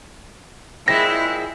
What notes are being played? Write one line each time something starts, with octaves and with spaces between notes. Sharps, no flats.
A#2 G#3 C4 E4 A#6